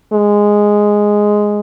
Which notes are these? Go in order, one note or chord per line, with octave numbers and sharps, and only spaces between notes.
G#3